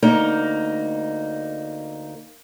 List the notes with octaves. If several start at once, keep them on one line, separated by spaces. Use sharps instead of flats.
D2 A#3 D#4